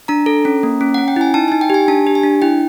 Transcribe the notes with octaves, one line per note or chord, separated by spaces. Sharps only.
D4 A#5
A4
C#4
A#3
C#4
C#4 F#5
G5
E4 G#5
D#4 A5
D#4 G#5
G5
G4 G#5
D4 A5
G4
G#5
D4
E4 G5